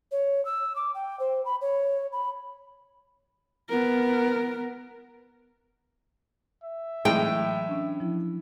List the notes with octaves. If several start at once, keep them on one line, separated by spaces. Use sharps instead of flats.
C#5
E6
D6
G5
C5
B5
C#5
B5
B3 A#4
E5
A2 E3 F#3 G#3 G5
C#4 D4
F3 E4